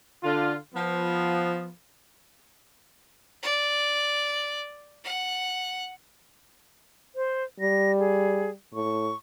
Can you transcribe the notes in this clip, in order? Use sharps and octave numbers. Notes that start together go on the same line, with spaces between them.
D3 F4
F3 B3
D5
F#5
C5
G3 A#6
G#4
A2 C#6